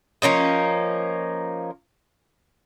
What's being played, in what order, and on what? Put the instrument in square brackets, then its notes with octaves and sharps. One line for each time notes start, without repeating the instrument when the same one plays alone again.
[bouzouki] F3 A#3 C#4 D#4